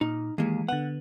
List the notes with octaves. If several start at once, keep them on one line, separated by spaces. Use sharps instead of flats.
A#2 D#4
D#2 E3 G#3 A#3
D3 B3 F#5